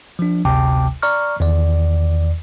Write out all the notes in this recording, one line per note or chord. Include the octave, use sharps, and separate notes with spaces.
F3 D4
G#1 D2 C3 G5 A5 D6
D5 A#5 C#6 F6
E2 D#3 D5